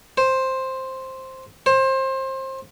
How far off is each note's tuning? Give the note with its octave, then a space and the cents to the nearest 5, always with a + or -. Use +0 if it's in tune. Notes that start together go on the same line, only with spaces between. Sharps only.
C5 +5
C5 +25